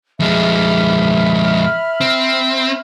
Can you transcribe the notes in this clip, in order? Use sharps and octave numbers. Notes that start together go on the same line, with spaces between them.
F2 G#3 E5 B5 F6
C4